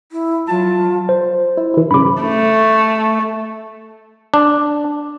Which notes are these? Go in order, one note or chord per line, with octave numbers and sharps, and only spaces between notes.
E4
F#3 F4 A5
C5
E4
E3 E4
G2 C#3 B5 D6
A3
D4